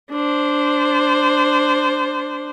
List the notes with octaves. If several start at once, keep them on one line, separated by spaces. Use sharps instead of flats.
D4 C5